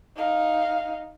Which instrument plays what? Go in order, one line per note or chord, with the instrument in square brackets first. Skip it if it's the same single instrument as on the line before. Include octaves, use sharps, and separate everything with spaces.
[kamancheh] D#4 F5